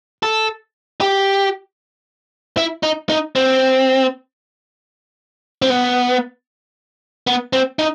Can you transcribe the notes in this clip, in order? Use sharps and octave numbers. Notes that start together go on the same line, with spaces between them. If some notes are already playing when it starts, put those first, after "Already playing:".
A4
G4
E4
D#4
D#4
C4
C4
B3
B3
C4
D#4